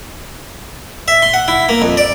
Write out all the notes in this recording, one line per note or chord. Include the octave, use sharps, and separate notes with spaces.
E5
C6
F#5
E4
A#3
F2
D5